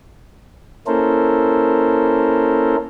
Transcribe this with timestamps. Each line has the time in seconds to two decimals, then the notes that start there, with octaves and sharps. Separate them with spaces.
0.87 A#3 C#4 E4 A4 A#4 C5